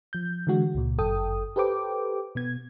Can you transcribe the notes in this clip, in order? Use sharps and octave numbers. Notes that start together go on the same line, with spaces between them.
F3 G6
D3 E3 G#3 F#4
C#2 A#2
G1 F#2 A4 G5 D#6
G4 A4 B4 C5 G5 D6
B2 B3 G#6